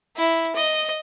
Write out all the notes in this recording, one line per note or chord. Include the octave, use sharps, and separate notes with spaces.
E4
D#5